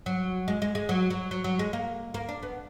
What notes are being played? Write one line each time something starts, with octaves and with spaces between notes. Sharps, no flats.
F#3
G#3
G#3
G#3
F#3
F#3
F#3
F#3
G#3
A#3
A#3
D4
B3